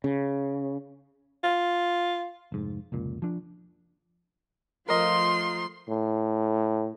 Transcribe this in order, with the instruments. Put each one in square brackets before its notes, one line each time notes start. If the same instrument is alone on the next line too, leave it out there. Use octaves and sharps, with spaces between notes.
[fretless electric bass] C#3
[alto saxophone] F4
[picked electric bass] F1 G#2
F1 C#2 A#2
F3 D4
[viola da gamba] F3 A3 F4 [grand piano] A#4 D#5 [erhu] C6
[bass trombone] A2